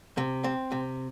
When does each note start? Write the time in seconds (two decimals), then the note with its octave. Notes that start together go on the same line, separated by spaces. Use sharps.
0.18 C3
0.44 C4
0.72 C3